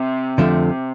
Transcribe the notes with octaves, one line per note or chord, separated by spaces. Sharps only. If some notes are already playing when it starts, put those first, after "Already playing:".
Already playing: C3
F2 D3 F3 A3